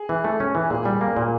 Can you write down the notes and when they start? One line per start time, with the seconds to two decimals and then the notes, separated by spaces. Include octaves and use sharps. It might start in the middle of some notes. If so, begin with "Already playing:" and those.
Already playing: G#4
0.09 E3
0.24 A3
0.40 C#4
0.55 E3
0.70 A#2 G#4
0.85 G3
1.01 A#3
1.17 A#2